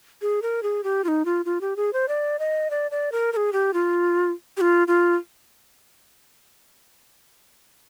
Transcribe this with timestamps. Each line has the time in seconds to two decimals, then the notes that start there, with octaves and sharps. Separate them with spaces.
0.22 G#4
0.42 A#4
0.63 G#4
0.84 G4
1.04 F4
1.08 D#4
1.25 F4
1.45 F4
1.61 G4
1.76 G#4
1.93 C5
2.08 D5
2.39 D#5
2.70 D5
2.91 D5
3.12 A#4
3.33 A#4
3.37 G#4
3.53 G4
3.74 F4
4.57 G4
4.61 F4
4.88 F4